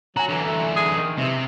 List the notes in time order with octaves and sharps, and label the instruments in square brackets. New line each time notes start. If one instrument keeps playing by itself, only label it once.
[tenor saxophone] F#3 [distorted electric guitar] F#4 [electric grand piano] G#5 A#5
[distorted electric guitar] D3 E3
[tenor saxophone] A3
G#4
D#3
[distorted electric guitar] C3 [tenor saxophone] E3